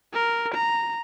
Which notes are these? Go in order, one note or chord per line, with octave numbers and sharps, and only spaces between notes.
A#4
A#5